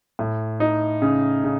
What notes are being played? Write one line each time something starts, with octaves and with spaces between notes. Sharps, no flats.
A2
D#4
C#3
C#3